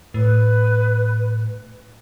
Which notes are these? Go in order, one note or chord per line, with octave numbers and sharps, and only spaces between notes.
A2 B4